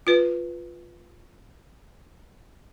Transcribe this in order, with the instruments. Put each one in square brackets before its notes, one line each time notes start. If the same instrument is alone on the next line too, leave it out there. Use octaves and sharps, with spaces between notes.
[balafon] F4 B4